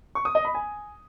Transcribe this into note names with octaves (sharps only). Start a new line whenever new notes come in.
C#6
D#6
D#5
B5
G#5